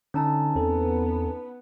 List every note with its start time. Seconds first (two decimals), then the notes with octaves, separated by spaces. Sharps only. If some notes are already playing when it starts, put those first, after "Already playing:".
0.14 D3 C#4 D#4 A5
0.55 E2 B3 C4 A4